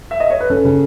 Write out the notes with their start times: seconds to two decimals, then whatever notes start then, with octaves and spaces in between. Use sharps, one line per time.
0.11 E5
0.20 D#5
0.30 C#5
0.40 B4
0.50 C#4 A4
0.65 C#3